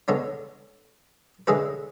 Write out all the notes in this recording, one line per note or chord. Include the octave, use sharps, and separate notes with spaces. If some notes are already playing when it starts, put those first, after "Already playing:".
C#3 G#3 B3 D4 A4 C#5
D3 G#3 C#4 E4 G#4 B4